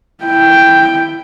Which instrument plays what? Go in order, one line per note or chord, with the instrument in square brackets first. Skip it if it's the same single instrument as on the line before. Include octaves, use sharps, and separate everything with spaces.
[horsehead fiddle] E4 G5